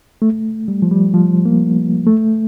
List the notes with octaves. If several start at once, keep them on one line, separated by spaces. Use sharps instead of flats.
A3
G3
F3
G3
F3
A#3
A3